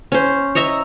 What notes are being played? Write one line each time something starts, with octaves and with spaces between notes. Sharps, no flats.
C#4 C5
C#5 D#5 E5 A#5